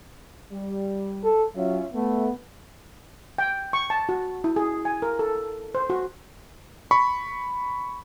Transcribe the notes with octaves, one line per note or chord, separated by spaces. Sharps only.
G3
A4
F#3 C#4 F4 E5
A3 B3
G5
C#6
A5
F#4
E4
G#4
G#5
A#4
A4
C5
F#4
B5 C#6